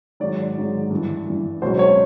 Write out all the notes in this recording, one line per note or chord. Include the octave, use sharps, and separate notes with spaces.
G#2 D#3 F#3 D5
G#2 D#3 F#3
G2 E3
G2 E3
C#2 B2 F#3 C5
C#5